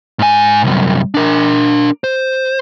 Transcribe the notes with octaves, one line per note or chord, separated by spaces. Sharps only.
G#2 G#5
C2 F#2
D4 A#4
C5